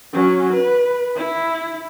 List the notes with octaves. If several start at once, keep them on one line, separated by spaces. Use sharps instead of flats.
F#3 C#4
B4
E4